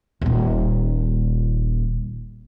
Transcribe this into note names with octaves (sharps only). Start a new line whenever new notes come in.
D#1 A#2